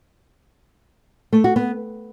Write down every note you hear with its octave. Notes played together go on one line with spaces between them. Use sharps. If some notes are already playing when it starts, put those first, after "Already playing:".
A3
F#4
B3